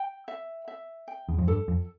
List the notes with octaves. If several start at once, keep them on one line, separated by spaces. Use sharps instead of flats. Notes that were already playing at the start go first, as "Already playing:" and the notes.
Already playing: G5
E5
E5
G5
E2
F2
G2 A4
F2